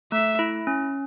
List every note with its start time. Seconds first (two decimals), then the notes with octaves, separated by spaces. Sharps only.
0.12 A3 E5
0.39 E4
0.67 C#4